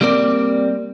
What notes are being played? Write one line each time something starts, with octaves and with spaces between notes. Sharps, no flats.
G3 A#3 C4 A#4 D5